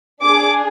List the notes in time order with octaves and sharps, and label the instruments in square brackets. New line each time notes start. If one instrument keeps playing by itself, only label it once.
[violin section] D4 G#4 D6